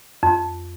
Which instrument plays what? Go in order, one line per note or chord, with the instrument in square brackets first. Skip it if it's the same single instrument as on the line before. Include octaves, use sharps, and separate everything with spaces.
[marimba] F2